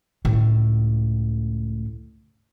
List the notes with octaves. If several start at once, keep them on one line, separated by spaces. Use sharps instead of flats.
C#2 A2